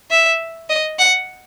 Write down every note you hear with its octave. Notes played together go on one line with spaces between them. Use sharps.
E5
D#5
F#5